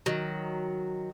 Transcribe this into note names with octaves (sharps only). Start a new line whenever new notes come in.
D#3 F#3